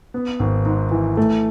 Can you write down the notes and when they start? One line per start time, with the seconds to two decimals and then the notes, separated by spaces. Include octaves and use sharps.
0.14 B3
0.39 G#1
0.66 G#2
0.91 E3
1.17 A3